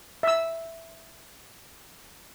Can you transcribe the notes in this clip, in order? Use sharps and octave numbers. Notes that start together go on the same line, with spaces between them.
E5 E6